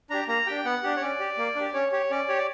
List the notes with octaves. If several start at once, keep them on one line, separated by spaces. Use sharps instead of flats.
D4 G4 A#5
A#3 A#5
D4 G4 G5
B3 F#5
D4 G4
C#5
C#4 D5
G4
A#3
D4 G4
C#4 C#5
G4 C#5
C#4 D5
G4 C#5
D5